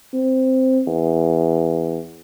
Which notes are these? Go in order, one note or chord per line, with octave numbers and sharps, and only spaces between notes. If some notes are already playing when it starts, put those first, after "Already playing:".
C4
E2